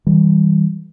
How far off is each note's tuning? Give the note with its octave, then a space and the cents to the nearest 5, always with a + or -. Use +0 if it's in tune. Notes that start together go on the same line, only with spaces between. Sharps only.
E3 -45 G3 -5